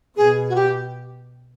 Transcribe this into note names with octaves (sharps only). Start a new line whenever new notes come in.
B2 G#4
F#4
G4